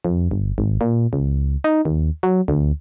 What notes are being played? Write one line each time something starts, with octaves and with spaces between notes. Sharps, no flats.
F2
G1
G#1
A#2
C#2
D#4
D#2
F#3
D2